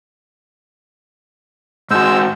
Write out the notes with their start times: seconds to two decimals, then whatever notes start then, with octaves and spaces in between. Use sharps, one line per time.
1.91 G#2 G#3 F#4 C5 E6